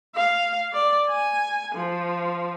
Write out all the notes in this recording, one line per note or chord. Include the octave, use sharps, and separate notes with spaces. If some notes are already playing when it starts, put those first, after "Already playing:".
F5
D5
G#5
F3